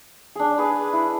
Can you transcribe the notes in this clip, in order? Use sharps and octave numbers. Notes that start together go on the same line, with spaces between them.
D4 G#4
G#4 B4
E4